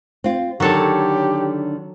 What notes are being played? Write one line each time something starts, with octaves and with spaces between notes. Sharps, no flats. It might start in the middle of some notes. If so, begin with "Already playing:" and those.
C4 F4
D3 D#3 F#3 G4 A4 C#5